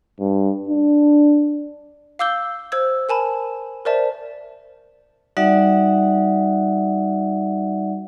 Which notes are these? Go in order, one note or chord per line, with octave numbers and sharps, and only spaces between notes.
G2
D4
F5 D6 E6 G6 G7
C5 E6 G#6
A#4 G#5 A5 B5
A#4 C5 D5 E5 A5
G3 D#4 F#4 D5 E5 F#5